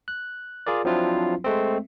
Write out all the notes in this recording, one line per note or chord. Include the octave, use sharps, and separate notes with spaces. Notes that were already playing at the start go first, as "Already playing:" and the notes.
F#6
F4 G#4 A#4 D5
F3 F#3 C4 D4 E4 F4
G#3 A3 C4